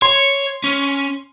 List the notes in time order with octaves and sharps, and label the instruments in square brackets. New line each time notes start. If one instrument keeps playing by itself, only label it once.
[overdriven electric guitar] C#5 [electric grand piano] C6
[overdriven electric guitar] C#4